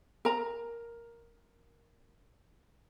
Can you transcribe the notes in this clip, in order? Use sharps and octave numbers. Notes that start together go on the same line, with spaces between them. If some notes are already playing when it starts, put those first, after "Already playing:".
A#4 A#5